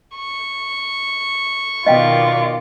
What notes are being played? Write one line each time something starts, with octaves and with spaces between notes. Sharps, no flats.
C#6
B2 D#3 F4 D5 D#5 F5 G5